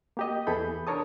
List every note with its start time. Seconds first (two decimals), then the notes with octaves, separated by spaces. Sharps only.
0.17 A#3 G4 D#5
0.47 E2 E3 G#4 A4 B5 G6
0.87 D4 A#4 C#5 A5 D#6